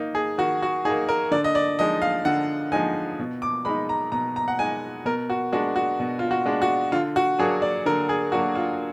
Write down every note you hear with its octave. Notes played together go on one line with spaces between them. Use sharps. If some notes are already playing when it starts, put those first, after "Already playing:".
Already playing: D#3 A#3 D#4
G#4
D#3 F#4
F#4
A#3 D#4 G#4
A#4
D3 D5
D#5
D5
F3 G#3 D#4 D#5
F5
D3 F#5
F3 G#3 D#4 G#5
B2
D6
G#3 D#4 B5
A#5
B2 A#5
A#5
F#5
G#3 D#4 G#5
B2 A#4
F#4
G#3 D4 F#4
F#4
B2
F4
F#4
G#3 D4
F#4
D3 F4
F#4
F#3 A#3 D4 G#4
D5
D3 A#4
G#4
F#3 A#3 D4 F#4
F4